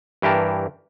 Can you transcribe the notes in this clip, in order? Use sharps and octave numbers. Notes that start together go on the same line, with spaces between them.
G2 E3 G4 A#4 A5